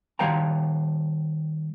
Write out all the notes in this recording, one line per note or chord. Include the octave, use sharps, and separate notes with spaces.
D#3 G3 C5 F5 G5 A#5